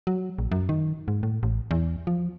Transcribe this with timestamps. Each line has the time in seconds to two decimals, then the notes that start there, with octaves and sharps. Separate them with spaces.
0.07 F#3
0.39 A#1
0.52 F#2
0.69 D#3
1.08 G#2
1.23 A2
1.43 A1
1.71 E2
2.07 F3